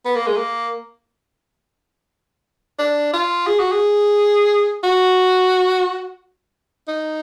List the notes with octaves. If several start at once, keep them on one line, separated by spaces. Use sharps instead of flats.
B3
A#3
G#3
A#3
D4
F4
G#4
F#4
G#4
F#4
D#4